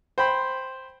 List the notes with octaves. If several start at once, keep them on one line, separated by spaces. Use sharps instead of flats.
C5 G5 B5 C6